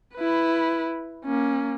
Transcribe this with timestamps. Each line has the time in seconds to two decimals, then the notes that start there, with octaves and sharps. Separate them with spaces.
0.15 E4 B4
1.25 A#3 C#4